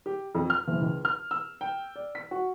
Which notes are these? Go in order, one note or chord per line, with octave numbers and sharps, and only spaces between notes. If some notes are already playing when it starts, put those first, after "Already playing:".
G4
F2
F6
F#1
C#2
F6
E6
G5
D5
B6
F#4